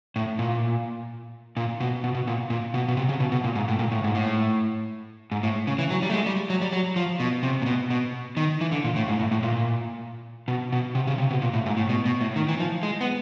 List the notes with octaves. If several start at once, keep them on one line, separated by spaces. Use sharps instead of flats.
A2
A#2
A#2
B2
B2
B2
A#2
A#2
B2
B2
C3
C#3
B2
B2
A#2
G#2
A2
A#2
A2
G#2
A2
G#2
A2
C#3
E3
F#3
G3
A3
G#3
G3
F#3
G3
F#3
F3
B2
C3
A#2
B2
B2
D#3
E3
D3
A#2
A2
G#2
A2
A2
A#2
B2
B2
C3
C#3
C3
B2
A#2
A2
G#2
A2
B2
B2
A2
D#3
E3
F3
G#3
B3